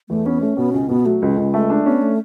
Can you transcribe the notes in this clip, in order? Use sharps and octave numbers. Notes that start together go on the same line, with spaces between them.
E2 A3
B3 C#4
A3 C#4
B2 B3
C#2 C#4
B2 B3
F#3 A3
C#2 G#3
C#2
A3
D4
B3 C#4
A3